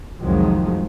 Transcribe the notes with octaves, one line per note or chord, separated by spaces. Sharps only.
C2 F2 D#3 F3 F#3 G#3